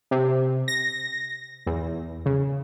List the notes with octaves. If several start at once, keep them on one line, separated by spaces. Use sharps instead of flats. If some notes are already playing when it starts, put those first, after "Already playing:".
C3
A#6
E2
C#3